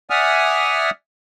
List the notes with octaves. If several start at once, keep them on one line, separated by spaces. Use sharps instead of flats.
D5 E5 F#5 G#5 D#6 F6